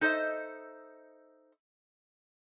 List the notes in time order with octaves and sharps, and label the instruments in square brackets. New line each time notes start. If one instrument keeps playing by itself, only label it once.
[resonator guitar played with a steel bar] D#4 A4 C5 D#5 E5